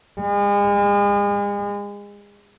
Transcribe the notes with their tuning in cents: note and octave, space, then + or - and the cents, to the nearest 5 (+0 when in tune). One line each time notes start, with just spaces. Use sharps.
G#3 -40